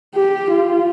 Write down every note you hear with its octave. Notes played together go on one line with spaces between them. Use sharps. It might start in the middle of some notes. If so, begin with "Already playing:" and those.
G4
F4